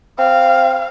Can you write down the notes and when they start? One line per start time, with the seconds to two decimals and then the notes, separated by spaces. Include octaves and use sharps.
0.19 C4 F5